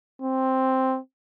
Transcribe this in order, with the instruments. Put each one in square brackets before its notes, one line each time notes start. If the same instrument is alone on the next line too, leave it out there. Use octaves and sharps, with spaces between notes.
[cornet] C4